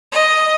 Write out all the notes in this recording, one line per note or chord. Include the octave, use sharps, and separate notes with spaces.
D#5